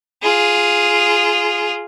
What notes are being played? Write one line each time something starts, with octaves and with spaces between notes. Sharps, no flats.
F4 G#4